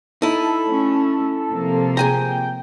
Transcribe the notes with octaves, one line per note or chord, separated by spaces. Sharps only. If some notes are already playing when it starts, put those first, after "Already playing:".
D#4 E4 A4
A3 C#4
C3 F3 A#3
G#4 G5 G#5 A#5